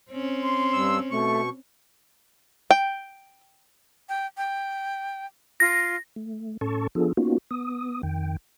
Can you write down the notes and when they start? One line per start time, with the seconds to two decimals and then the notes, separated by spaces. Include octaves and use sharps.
0.10 C4 C#4
0.43 C6
0.73 G2 E6
1.11 B2 A3 C#6
2.71 G5
4.09 G5
4.37 G5
5.60 F4 A#6
6.16 A3
6.61 A2 C#4 A4 A5 C#6
6.95 F3 B3 D4 F4 G#4 A4
7.17 A#3 B3 C#4 D#4 F4 F#4
7.51 B3 D#6
8.03 F2 D#3 G5